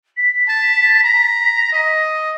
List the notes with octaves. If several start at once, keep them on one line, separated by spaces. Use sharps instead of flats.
B6
A5
A#5
D#5